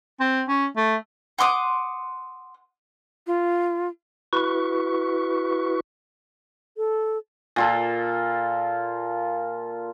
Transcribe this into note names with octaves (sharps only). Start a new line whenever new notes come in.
C4
C#4
A3
F#5 C6 D6 D#6
F4
E4 F#4 B4 C#6
A4
A#2 F4 A4